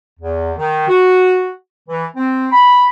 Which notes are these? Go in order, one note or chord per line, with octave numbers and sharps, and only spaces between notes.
E2
D#3
F#4
E3
C4
B5